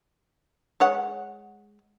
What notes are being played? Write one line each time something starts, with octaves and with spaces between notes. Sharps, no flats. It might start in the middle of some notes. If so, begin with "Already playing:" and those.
G#3 C#5 F#5